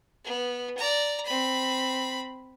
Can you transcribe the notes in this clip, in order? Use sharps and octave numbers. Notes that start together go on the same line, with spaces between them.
B3
D5 A#5
C4 B5